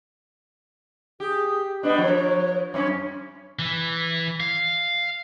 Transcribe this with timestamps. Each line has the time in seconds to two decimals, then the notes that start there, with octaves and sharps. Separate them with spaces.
1.20 G4 G#4
1.83 G3 B3 D4 D#5
1.98 F3 C#5
2.74 F#2 C#4 C#5
3.59 E3
4.40 F5